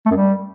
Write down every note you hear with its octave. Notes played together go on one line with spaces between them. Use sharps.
A3
F#2
G3